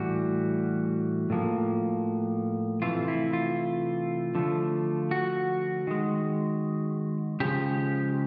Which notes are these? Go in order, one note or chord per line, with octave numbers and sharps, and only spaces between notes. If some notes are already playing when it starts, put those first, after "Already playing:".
Already playing: A2 E3 G3 F#4
A2 F3 A#3
C3 E3 A3 F4
E4
F4
D3 F3 A3
F#4
D#3 G#3
C#3 F3 G#3 G4